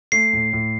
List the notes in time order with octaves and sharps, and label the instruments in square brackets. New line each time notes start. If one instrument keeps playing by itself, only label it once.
[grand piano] A3 [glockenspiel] C7
[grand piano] A2
A2